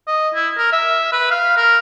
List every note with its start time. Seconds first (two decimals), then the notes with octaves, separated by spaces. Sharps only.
0.07 D#5
0.35 E4
0.58 A#4
0.72 E5
1.12 B4
1.31 F5
1.57 A#4